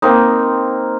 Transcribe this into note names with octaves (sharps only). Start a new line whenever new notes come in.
A#3 C4 D#4